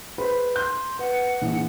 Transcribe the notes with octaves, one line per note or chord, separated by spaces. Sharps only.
G#4 B4 C5 B5
C6 G6
B4 F#5
A#1 E3